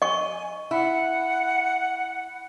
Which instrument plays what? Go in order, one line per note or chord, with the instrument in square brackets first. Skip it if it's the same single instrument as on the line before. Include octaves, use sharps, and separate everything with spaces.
[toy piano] D#5 C#6 [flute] G#5
[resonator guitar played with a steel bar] E4 [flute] F#5